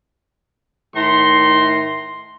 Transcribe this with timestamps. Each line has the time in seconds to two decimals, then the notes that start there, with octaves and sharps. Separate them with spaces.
0.95 A2 D#3 A#5 C6